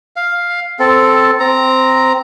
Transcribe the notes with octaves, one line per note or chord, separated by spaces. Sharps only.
F5
C4 A4
C4 A#5